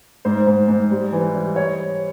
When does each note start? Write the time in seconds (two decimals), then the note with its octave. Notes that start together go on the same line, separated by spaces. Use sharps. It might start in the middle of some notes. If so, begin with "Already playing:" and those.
0.25 G#2 C5
0.47 G#2
0.68 G#2
0.91 G3
1.13 E3
1.34 G3
1.56 C#5